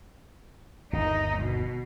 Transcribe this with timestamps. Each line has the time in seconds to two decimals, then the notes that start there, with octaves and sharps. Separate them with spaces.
0.93 G1 D#2 D#4
1.39 B2